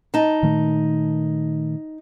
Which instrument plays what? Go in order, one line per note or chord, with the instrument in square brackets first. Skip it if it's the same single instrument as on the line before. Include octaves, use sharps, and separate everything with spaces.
[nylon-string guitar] D#4 A5
[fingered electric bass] A#2 D#3 A3